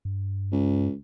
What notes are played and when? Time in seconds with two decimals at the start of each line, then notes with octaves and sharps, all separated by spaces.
0.05 G2
0.52 C#2